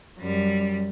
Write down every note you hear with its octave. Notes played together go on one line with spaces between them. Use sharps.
F#2 G3